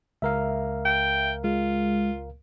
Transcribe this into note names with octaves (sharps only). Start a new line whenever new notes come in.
C#2 A#4 E5 F5
G5
G#3 F4